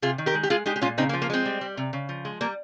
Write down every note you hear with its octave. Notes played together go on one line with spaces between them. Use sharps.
C3 F4 G#4
D#3
G4 A#4
G#3
G4
G#3 F4 G#4
G#3 D#4 G4
G4
A#2 C#4 F4
C#3 C4 D#4
A#3
F3
A#3
G#3 C4
G3
G3
C3
C#3
F3
G#3
G3 A#3